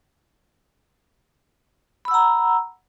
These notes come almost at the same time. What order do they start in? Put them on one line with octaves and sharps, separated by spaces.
B5 E6 F#5 A#5